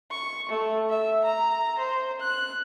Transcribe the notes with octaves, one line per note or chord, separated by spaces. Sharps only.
C#6
A3
E5
A#5
C5
F#6